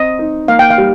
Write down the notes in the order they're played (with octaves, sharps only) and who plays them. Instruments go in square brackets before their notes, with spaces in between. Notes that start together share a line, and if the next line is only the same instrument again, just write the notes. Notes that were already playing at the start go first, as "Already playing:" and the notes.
Already playing: [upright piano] C4 [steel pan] D#5
[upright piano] D#4
[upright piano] A#3 [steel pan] F5
[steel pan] G5
F5
[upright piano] G3